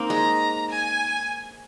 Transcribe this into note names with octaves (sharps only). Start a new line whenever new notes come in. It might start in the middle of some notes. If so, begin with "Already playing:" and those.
Already playing: A#3 C4 D#4
G#3 A#5
G#5